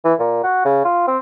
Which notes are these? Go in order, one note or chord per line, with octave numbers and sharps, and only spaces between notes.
E3
A#2
F#4
C#3
F4
C4